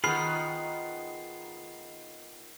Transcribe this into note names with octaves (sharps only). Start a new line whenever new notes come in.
D#3 B3 F4 G#4 B5 F6 C7